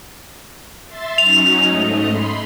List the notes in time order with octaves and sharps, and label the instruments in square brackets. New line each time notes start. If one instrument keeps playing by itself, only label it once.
[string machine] E5 C6 A6
[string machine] F#3 C#4 D#4 [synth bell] F7
[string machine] G#2 A3 D#5
B5 C6